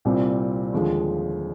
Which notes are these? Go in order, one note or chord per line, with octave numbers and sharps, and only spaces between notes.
C2 A#2 G3 C4
D#2 D3 F3 G#3